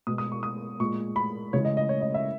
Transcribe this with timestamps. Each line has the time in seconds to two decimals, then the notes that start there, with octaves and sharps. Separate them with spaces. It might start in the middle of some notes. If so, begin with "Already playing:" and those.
0.07 B2 G#3 D#6
0.18 D#6
0.32 C#6
0.43 D#6
0.80 A#2 G#3 C#6
1.16 B5
1.53 C#3 E3 G#3 C#5
1.65 D#5
1.77 D#5
1.89 C#5
2.01 D#5
2.14 E5